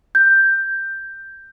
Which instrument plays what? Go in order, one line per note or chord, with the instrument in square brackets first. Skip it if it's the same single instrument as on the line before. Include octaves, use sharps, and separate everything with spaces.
[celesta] G6